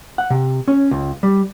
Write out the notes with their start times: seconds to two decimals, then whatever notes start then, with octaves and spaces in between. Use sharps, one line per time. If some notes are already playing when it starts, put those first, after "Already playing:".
0.18 F#5
0.30 C3
0.68 C#4
0.91 C#2
1.23 G3